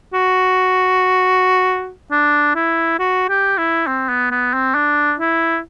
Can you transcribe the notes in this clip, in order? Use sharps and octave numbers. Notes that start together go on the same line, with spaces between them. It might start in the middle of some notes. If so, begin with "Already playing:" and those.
F#4
D4
E4
F#4
G4
E4
C4
B3
B3
C4
D4
E4